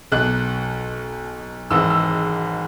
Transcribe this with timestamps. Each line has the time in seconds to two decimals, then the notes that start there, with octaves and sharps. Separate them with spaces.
0.12 B1 B2 F#6
1.71 G#1 G#2 E3 E6
1.90 E6